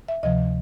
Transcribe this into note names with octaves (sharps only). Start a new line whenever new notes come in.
E5
D2 C3 F3 D#5